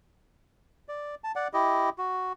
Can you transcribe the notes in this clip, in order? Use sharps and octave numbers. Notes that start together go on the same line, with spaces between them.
D5
A5
D5 F#5
E4 G4 D#5
F#4